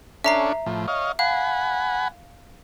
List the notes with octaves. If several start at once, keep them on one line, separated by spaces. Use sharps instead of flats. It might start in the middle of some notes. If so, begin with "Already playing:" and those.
C#4 D4 A4 E5 A#5 C7
A2 F3
C#5 D#5 F5
F5 F#5 G#5 B5